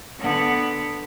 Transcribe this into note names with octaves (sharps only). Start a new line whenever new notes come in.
D3 B3